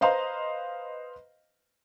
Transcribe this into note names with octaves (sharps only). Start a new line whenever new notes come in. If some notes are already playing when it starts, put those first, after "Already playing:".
B4 C5 D#5 F5 A#5 C6